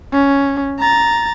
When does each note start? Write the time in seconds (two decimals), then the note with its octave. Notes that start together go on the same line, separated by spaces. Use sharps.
0.13 C#4
0.79 A#5 A6